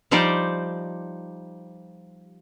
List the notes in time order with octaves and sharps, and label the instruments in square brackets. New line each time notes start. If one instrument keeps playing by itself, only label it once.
[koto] F3 G3 D#4 G4 C5 D5